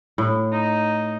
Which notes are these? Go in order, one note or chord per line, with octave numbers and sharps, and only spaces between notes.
A2
D#4